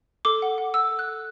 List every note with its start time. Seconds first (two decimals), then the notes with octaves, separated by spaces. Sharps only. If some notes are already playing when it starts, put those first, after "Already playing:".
0.25 A4 D6
0.42 F#5
0.58 F#5
0.74 F#5 E6
0.91 A4
0.99 F#6
1.07 A4